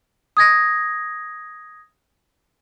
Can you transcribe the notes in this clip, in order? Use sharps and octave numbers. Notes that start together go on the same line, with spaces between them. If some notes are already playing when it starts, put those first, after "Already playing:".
D#6 G#6 A#6